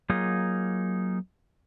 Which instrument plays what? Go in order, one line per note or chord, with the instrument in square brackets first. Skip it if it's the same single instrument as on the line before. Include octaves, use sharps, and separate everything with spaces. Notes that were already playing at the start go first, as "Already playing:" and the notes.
[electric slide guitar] F#3 A#3 D#4 F4 G#4